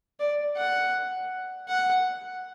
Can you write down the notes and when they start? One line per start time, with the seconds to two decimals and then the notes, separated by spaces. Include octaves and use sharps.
0.20 D5
0.57 F#5
1.69 F#5